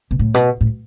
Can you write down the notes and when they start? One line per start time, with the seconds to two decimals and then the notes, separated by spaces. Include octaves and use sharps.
0.11 B2
0.19 A2
0.34 B2
0.61 A2